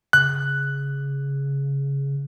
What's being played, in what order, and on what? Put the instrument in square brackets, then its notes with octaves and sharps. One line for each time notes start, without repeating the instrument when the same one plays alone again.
[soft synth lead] C#3 [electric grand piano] F#6